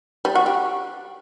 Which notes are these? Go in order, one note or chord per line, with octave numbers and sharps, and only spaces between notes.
G3
F#4
G4